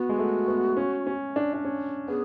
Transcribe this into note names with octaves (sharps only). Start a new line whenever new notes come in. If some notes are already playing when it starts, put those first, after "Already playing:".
Already playing: B3 F#4
G#3
A3
B3
C#4
C#4
D4
D4
C#4
B3 G#4